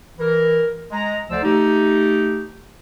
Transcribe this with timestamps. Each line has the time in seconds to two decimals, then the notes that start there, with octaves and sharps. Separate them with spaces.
0.18 E3 A#4
0.91 G#3 A#5
1.30 D2 D3 F3 C5 D5 E6
1.43 A3 D#4 G4